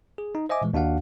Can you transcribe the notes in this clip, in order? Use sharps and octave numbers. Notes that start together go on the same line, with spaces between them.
G#4
D#4
C5 D#5 E5 G#5 D6
A#2 E3 G#3
D#2 D4 F#4 F5 F#5